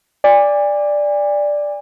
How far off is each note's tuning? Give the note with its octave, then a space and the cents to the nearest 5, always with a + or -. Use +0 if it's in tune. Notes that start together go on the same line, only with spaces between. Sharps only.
D5 +0 G#5 -40